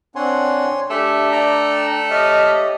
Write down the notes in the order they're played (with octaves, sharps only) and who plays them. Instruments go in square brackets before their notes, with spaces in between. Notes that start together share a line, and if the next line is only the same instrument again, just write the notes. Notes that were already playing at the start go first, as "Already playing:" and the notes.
[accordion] C4 D4 F#5 [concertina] C#5 G#5 C6
[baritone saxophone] A3 [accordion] D4 [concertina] G4 E5
[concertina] D5 G5 A#5
[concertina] G4 C#5 [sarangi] D#5 [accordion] E5 A5 F6